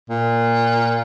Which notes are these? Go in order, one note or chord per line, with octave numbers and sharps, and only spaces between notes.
A#2